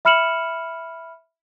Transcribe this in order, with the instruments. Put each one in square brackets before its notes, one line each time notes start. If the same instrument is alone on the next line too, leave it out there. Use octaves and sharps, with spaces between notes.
[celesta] E5 B5 F6 C#7 E7 F#7